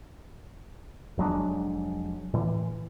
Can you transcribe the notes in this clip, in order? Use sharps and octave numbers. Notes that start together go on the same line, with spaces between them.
F1 F#3 G#3 D4
A2 E3